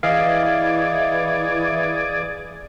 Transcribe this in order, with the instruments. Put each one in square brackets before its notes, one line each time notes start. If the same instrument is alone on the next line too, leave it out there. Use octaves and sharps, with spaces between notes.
[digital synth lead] E3 [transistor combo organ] G#4 D5 [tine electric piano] D#5 F5